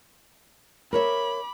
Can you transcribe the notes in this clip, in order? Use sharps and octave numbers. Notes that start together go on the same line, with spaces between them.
A#4 C#5 E5 B5 D6